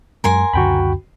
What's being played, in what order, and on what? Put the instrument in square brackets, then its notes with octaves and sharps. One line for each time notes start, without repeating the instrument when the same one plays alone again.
[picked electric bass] F#2 F#3 G#3 [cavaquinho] A#4 G#5 C6
[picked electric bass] C#2 F#2 D3 [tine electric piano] F#4 G5 B5